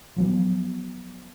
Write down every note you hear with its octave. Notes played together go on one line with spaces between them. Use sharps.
F3 F#3 B3